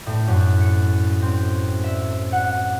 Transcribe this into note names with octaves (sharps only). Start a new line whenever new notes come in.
A2
F#2
C#7
C4
E5
F#5